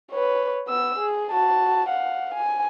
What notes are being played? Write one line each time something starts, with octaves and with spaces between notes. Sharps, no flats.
B4 C#5
B3 E6
G#4
F#4 A5
F5 F#5
G#5